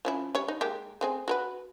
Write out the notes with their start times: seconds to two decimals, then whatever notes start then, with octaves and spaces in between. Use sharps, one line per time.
0.05 F3 C#4 E4
0.35 G3 C#5
0.48 D#4
0.61 G#3 A#3 G4
1.01 A3 C4 G#4
1.28 F#4 A#4 B4